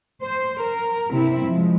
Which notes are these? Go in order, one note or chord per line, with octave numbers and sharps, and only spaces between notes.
C5
A#4
G2 C3 C4 E4
F3 G#3